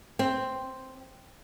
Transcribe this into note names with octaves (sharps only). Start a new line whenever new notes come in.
C4